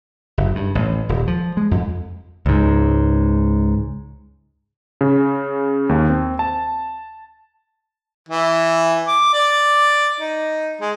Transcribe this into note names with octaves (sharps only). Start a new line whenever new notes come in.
F#1
G2
A1
D#1
F3
G#3
F2
C#2 G#2
C#3
D#2
C4
A5
E3
D6
D5
D#4
G#3